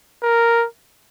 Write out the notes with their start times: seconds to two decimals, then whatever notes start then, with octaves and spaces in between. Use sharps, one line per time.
0.23 A#4